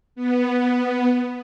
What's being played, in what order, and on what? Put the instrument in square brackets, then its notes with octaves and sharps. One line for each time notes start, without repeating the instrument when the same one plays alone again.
[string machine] B3